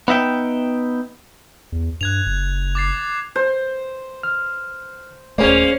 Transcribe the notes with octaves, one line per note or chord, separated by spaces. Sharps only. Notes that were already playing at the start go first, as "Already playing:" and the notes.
B3 D#4 E5 G5
E2
G2 F#6 G#6 F7
F#1
D6 A6 C7
C5
F6
D#1 A3 A#3 C#4 G#4 C5 D5